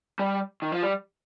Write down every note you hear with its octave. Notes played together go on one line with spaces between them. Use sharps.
G3
D#3
F3
G3